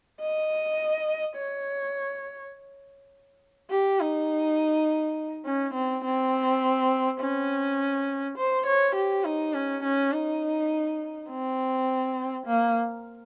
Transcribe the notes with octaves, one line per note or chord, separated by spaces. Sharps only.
D#5
C#5
G4
D#4
C#4
C4
C4
C#4
C5
C#5
G4
D#4
C#4
C#4
D#4
C4
A#3